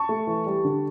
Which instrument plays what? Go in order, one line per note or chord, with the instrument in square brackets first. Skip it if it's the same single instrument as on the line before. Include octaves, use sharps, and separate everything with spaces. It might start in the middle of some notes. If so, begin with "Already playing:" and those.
Already playing: [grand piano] A5 C#6
A3
E3
G3
D3